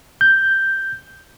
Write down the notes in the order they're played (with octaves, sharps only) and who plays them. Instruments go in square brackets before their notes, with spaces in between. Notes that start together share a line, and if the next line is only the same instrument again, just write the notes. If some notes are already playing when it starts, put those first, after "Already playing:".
[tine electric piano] G6